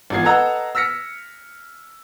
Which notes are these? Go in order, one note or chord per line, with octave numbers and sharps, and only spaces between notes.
G#1 E3 B3 F4 G#6 C7
A4 B4 D#5 F#5 A#5 E6
E6 F6 A#6 B6 C#7